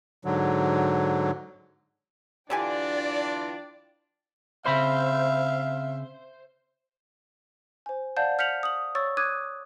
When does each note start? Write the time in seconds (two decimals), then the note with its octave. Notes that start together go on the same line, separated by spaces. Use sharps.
0.25 G#2 D3 F#3
2.50 D3 E3 D4 F4 G4 D5 G5 G#5
4.66 C#3 C4 C5 E5 F5 B5
7.86 C5 G#5
8.17 D5 F5 F#5 A5 G6
8.39 F6 G6 B6 C#7 F7 F#7
8.63 D#6 F#7
8.95 C#5 C#6 E6 A6
9.17 D6 D#6 F#6 G#6 D#7